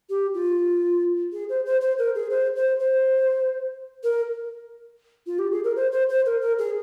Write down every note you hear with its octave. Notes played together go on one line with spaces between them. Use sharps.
G4
F4
G#4
C5
C5
C5
A#4
G#4
C5
C5
C5
A#4
F4
G4
G#4
A#4
C5
C5
C5
A#4
A#4
G#4